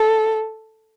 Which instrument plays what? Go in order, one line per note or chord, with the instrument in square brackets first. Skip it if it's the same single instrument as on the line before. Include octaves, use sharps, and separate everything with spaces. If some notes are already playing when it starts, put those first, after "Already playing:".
Already playing: [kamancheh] A4